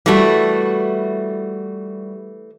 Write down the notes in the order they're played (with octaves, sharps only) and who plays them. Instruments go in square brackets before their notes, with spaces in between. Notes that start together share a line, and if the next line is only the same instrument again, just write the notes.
[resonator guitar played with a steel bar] E3 A3 [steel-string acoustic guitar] G3 F#4